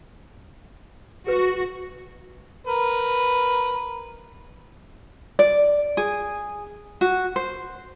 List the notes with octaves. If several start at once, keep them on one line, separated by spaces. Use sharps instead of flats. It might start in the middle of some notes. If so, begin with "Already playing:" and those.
F#4 G#4 B4
A#4 B4
D5
G#4
F#4
C5